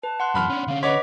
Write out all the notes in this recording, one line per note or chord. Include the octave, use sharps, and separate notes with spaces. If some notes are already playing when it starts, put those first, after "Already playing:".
B4 A5
F#5 C6 F#6
F#2 E3 B5 F6
C#4 D4
D3 C#4 F5
B4 C#5 D#5 F#5 D6 B6